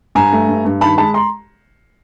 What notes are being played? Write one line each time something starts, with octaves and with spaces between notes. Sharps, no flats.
G2 G#5 A#5
A3
G2
G2
D#3 A5 B5
G#3 A5 B5
A#5 C6